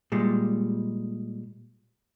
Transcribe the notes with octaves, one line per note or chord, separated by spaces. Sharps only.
A#2 G3 G#3